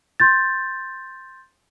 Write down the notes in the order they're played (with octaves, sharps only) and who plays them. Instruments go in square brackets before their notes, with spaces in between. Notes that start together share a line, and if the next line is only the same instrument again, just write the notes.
[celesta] C6 G6 A6